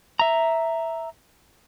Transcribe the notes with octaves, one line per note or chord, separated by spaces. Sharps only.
E5 A#5